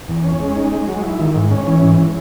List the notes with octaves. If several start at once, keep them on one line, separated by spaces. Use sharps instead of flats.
E2
C#4
G#3
D#4
G#3
F#3
E4
D#3
G#2
C#4
E3
G#2